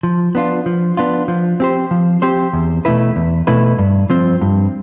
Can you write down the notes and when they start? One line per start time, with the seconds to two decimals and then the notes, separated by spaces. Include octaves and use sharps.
0.03 F3
0.35 B3 D4 F4
0.66 F3
0.97 B3 D4 F4
1.28 F3
1.60 C4 G4 C5
1.91 F3
2.22 C4 G4 C5
2.53 E2
2.85 B2 A3 E4 B4
3.16 E2
3.47 B2 A3 E4 B4
3.78 G2
4.10 F3 C4
4.41 G2